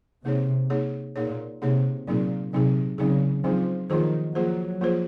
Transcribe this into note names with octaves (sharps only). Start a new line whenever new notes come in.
C3 A#3 D#4 G#4 C#5
A#3 D#4 G#4 C#5
A#2 A#3 D#4 G#4 C#5
C3 A#3 D#4 G#4 C#5
A#2 F#3 C4 D#4 G#4
C3 F#3 C4 D#4 G#4
C#3 F#3 C4 D#4 G#4
F3 F#3 C4 D#4 G#4
D#3 F3 A#3 F4 G#4 C5
F3 F#3 A#3 F4 G#4 C5
F3 A#3 F4 G#4 C5